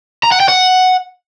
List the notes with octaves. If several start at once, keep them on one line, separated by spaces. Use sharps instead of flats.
A#5
F#5
G5
F#5